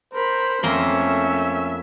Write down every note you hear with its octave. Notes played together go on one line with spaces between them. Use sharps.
A#4 C5 B5
F2 A3 A#3 C#4 E5 C6